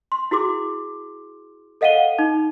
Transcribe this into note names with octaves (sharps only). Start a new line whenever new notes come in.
C6
E4 F#4 G#4 C6 D6
A4 D#5 F5 F#5 D#7 G7
D#4